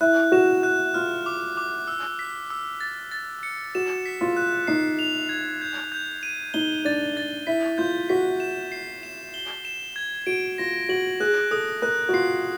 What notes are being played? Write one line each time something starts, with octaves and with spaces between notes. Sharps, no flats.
E4 F#6
F#4 E7
F#6
F4 F6
D6
D6
E6
B6
E6
A6
A6
C#7
F#4 E7
B6
F4
F#6
D#4 C7
F7
G#6
G6
G6
D#7
D#4 G7
D4 A6
A6
E4 B6
F4 G6
F#4 B6
E7
C7
E7
G7
E7
G#6
F#4 D7
F4 A#6
F#4 F#7
G#4 F#6
A4 D#6
A#4 F#6
F#4
F4 C7